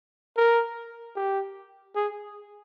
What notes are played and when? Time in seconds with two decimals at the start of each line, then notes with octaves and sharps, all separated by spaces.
0.37 A#4
1.16 G4
1.96 G#4